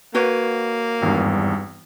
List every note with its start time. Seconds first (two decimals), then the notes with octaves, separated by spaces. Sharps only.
0.15 A#3 F#4 B4 C#5
1.02 G#1 E2 G2